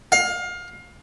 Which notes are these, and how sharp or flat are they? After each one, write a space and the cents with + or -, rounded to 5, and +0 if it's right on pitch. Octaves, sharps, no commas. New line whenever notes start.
F5 +25